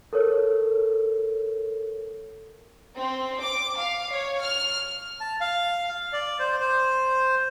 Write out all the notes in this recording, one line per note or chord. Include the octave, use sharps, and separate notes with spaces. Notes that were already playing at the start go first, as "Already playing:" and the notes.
A4 A#4 C#5
C4
D6
F5
C#5
F6
A5
F5
D5
C5
C5